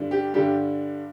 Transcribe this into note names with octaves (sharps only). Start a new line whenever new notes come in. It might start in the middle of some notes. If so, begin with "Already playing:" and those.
Already playing: G2 D3 G3 D4
G4
G2 D3 G3 D4 G4